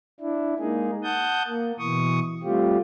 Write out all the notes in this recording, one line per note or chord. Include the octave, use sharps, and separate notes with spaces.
D4 E4
G#3 A#3 D#4 G#4
F#5 A5 D#6 G6
A#3
B2 E3 C#6 D#6
G3 A3 C4 F4 G4